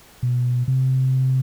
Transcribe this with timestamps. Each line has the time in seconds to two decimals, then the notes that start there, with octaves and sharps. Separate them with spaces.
0.23 B2
0.68 C3